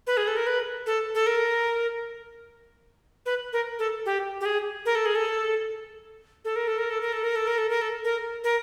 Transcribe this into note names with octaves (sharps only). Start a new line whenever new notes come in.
B4
G#4
A4
A#4
B4
A4
A4
A#4
B4
A#4
A4
G4
G4
G#4
A#4
A4
G#4
A4
A4
A#4
A4
A#4
A4
A#4
A4
A#4
A4
A#4
A4
A#4
A4
A#4
A#4